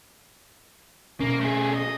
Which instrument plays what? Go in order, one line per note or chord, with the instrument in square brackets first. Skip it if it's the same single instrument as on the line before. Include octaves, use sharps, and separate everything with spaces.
[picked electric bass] B2 C#4 [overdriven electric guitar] A#3
[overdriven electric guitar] A3 G#4
D#5